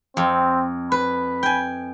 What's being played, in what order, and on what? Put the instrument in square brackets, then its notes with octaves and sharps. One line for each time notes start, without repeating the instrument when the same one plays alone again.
[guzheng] F2 [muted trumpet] C4
[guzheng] B4 [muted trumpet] B5
[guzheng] G5 G#5